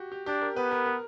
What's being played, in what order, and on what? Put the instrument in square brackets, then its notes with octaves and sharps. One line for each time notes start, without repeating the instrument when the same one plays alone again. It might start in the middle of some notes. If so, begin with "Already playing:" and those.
Already playing: [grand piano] F#4 G4
G4
[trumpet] D4 [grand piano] G4
[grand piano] A#4
[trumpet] B3 [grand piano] B4
[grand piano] A#4
A#4